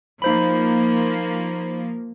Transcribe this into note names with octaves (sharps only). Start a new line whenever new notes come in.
F3 A#3 D#4 C5 B5